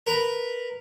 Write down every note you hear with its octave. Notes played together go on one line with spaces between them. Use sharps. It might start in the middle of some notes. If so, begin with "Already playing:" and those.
A#4 B4 A#5